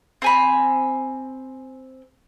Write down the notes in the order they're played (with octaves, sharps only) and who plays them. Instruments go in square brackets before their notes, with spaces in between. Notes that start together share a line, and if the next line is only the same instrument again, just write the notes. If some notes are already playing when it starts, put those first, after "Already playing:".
[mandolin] C4 G#5 B5